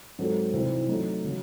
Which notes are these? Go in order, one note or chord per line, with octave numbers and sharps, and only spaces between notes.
G#2 F#3 C4 F#4 A4
C2 C3 E3 C4 D#4
C3 F#3 A3 D#4
C#3 F#3